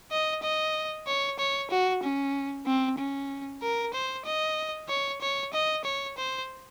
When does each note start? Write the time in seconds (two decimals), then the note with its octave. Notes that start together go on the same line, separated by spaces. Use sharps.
0.11 D#5
0.43 D#5
1.07 C#5
1.39 C#5
1.71 F#4
2.03 C#4
2.66 C4
2.98 C#4
3.62 A#4
3.94 C5
4.25 D#5
4.89 C#5
5.21 C#5
5.53 D#5
5.85 C#5
6.18 C5